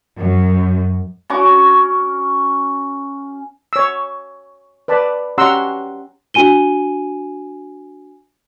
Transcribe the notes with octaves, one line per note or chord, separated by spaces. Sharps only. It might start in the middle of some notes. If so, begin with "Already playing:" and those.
F#2
C#4 F#4 C#6 D6
C#5 E6
B4 D5 A5 B5
C#4 G4 F#5 A#5 C6 E6
D4 F#4 G#5 D#7 G7